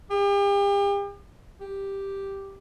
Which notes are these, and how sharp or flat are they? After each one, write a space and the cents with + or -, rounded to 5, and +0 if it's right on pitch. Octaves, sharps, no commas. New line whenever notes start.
G4 +40
G4 +0